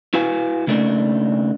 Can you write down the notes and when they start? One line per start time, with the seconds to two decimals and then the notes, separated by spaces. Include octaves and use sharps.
0.14 E4 F#4 B4 F5 G#5
0.67 C#3 A3 A#3 D4 D#4